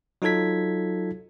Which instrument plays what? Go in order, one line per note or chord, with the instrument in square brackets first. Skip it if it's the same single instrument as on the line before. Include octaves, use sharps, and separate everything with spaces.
[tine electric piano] F#3 D#4 F4 A4 G#6 B6